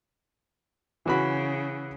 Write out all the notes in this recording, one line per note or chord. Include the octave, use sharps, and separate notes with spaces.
C#3 E3 F#4 B5